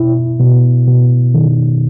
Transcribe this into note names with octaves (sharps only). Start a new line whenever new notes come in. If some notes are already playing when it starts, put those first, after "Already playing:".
Already playing: B2 E4
B2
B2
D#3